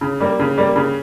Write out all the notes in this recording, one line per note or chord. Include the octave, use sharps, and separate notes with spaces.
C#3
G3 A#3
C#3
G3 A#3
C#3